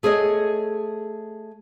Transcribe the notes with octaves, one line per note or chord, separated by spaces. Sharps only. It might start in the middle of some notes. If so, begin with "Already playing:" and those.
A3 G#4 A4 C#5 D#5